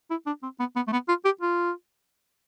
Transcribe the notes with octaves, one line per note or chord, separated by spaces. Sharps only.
E4
D4
C4
B3
B3
A3
B3
F4
G4
F4